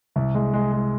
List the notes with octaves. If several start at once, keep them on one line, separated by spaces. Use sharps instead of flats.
C2
G#3
G#3
G#3